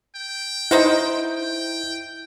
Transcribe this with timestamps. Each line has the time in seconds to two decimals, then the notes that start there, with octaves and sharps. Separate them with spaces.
0.16 G5
0.71 D#4 E4 C5 F#5
1.33 G5